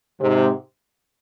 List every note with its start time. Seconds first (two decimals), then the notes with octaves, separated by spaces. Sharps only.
0.21 G#2 C3